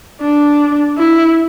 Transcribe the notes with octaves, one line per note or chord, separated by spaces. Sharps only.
D4
E4